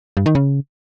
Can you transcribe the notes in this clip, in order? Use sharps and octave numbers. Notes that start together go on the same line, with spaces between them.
G2
D#3
C#3